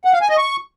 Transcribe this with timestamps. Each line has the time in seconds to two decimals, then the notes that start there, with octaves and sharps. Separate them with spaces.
0.05 F#5
0.13 F5
0.21 G#5
0.29 D#5
0.37 C#6